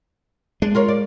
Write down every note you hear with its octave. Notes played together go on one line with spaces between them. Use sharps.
G#3 D4
F4 A#4 C#5
D5